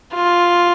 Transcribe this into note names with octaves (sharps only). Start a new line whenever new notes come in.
F4